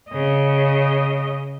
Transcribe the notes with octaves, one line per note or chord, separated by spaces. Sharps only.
C#3 D#5